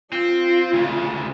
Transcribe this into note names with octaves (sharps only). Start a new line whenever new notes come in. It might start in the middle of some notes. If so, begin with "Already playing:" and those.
C4 F4
D2 C#3